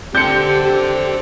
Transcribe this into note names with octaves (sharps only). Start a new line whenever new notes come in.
C4 D4 G4 A4 G6 C#7